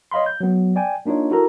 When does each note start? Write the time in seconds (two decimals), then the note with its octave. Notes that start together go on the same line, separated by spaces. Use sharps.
0.11 C#5 D#5 F5 B5 C6
0.26 G6
0.40 F#3 B3
0.76 D5 G5 G#5
1.06 A#3 D4 D#4 F4 C#5
1.31 E4 F#4 A4 A#4 A#5